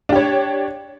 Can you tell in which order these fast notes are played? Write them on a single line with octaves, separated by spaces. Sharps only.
D4 G4 C#5